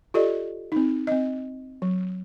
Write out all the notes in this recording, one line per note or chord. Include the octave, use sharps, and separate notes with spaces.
F4 G4 A4 D5 D#5
C4 D#4
C4 D#5
F#3